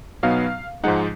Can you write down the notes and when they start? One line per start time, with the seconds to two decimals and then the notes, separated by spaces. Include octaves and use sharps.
0.23 B2 F#3 B3 D#4 F5
0.84 G#2 F3 G#3 D#4 F#5